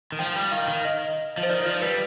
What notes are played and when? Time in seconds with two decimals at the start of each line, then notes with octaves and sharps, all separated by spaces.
0.12 D#3
0.19 F3 G5
0.36 G3
0.52 D#3 F5
0.68 D#3
0.85 D#5
1.38 F3
1.43 C5
1.49 D#3 D5
1.66 F3
1.82 G3 B4